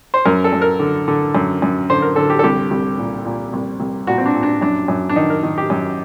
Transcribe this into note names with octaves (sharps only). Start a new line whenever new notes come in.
C5
F#2 A#4
A4
F#2
A#4
D3
D3
F#2
F#2
D3 C5
A#4
D3 A4
G4
A4
C2 G4
C2
A#2
A#2
C2
C2
A#2 F#4
C4
D4
A#2
D4
F#2 D4
F#2
D4
D#3 D#4
A#4
D#3
G4
F#2